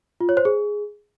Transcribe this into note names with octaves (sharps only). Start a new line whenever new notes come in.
F4
C#5
C5
G#4